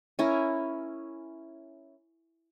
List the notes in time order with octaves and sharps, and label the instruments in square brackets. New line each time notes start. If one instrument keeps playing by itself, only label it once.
[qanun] C#4 E4 A#4